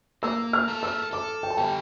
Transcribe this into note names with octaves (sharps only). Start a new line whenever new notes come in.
A#3 E6
F6
A4
E6
A4 D6
G5
A5
G3 G5